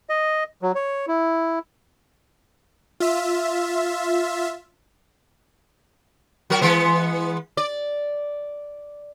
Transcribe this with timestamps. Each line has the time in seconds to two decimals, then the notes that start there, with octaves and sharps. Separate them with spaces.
0.09 D#5
0.62 F#3
0.75 C#5
1.08 E4
3.00 F4 E5
6.50 F#3 F#4 A#4
6.61 E3 G#3 B3
7.57 D5